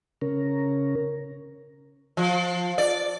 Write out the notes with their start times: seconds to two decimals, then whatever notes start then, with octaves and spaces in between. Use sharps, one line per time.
0.21 C#3 C#4 A#4
2.17 F3
2.78 D5